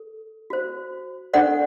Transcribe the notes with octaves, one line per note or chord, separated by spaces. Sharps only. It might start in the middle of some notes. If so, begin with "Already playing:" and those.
Already playing: A4
F#4 C5
D4 A4 C5 D5 F#5